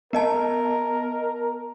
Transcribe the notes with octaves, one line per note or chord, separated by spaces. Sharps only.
B3 A#4 D#5 A5